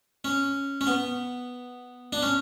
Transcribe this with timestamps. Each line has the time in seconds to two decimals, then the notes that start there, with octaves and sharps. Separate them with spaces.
0.24 C#4
0.81 C#4
0.87 B3
2.13 D4
2.23 C#4